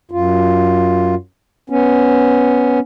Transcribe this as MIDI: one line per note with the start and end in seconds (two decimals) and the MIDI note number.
0.11 1.15 42
0.11 1.15 65
1.70 2.79 59
1.70 2.79 61